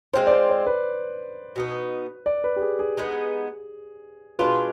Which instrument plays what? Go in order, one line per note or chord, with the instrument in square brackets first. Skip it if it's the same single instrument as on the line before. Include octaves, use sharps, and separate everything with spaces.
[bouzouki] G#3 C4 F4 [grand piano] C5
[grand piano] D5
C5
C5
B4
[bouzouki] B2 B3 D#4
[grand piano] D5
B4
G4
G#4
G#4
[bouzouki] G#3 B3 D#4
[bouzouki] B2 G#3 D4 F4 [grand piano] B4